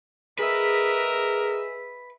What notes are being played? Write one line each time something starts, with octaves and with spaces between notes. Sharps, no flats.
G#4 A#4 B4 D#5 E5